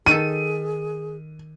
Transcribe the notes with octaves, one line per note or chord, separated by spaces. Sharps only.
D#3 G#4 A4 D#7